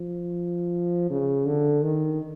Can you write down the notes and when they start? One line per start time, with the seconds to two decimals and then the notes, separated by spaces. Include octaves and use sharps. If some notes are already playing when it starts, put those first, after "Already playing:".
Already playing: F3
1.10 C#3
1.46 D3
1.82 D#3